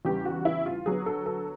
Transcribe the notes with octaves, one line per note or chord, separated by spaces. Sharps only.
E2 C#3 E3 G3 G4
F#4
E4
F4
D3 F#3 B3 G#4
A4
A4